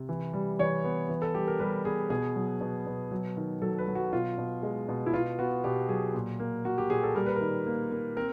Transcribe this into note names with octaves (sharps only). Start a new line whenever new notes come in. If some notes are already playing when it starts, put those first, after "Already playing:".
Already playing: C3
E3
G3
E3 C#5
B3
E3
A4
G3 G4
A#4
G3 B4
B3 G#4
B2 G#4
F#3
B2
B2
F#3
D#3
F#3 A4
B4
F#3
F#4
B2 F4
B2
G#3
B2
E4
B2 F4
B3 F#4
B2 G4
F#3 G#4
A#2
A#3
A#3 F#4
G4
A#2 G#4
A4
G3 A#4
B4
D#3 A#4
A#3
A#3
C4 A#4